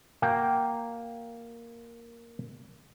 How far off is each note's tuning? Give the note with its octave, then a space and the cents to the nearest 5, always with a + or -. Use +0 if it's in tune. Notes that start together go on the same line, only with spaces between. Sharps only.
A#3 +0 F#4 +0 G5 +0